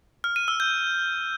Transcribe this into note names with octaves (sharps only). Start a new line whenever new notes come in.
F6
D#7
E6
G6